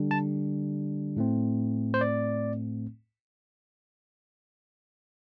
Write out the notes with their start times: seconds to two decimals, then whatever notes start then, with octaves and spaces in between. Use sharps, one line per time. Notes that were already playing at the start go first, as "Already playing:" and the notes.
Already playing: D3 G3 D4
0.11 A5
1.17 A2 A3 C4
1.94 C5
2.01 D5